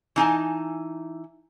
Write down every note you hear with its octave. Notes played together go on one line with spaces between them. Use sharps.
E3 D#4 G#5 A5